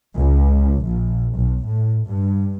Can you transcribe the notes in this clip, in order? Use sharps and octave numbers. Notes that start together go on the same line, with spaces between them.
C#2
A#1
B1
A2
G2